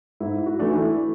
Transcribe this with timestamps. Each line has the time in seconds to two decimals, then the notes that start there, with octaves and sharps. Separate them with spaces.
0.20 G#2 E4
0.46 F#4
0.59 E3 A3 D4
0.71 E4